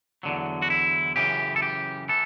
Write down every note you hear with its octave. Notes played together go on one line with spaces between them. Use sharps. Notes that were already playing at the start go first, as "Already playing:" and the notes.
E2 D3 F#3
F#4
E4
F#2 C#3 E3 G4
A4
G4
E3 A4